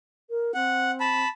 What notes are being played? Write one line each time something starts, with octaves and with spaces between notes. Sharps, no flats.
A#4
C4 F#5
A5 B5